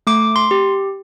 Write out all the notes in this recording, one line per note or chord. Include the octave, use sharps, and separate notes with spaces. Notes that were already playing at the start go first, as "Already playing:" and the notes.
A3 D6
C6
G4